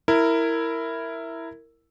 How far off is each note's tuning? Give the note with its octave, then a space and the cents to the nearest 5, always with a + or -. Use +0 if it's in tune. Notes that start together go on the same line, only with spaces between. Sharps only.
E4 +0 A#4 -15